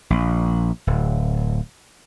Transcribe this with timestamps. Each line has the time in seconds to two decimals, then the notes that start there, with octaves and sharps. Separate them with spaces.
0.10 A#1
0.87 D1